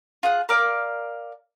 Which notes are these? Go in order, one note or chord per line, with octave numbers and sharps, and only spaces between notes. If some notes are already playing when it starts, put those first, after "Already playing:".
F4 G#4 F#5
A#4 D5 F5 D6